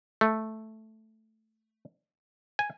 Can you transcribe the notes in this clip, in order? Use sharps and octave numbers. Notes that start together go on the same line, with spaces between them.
A3
G#5